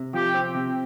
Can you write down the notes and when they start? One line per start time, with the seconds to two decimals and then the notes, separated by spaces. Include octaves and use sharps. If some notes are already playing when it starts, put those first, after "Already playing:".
Already playing: C3
0.13 F3 G4
0.34 C4
0.55 C3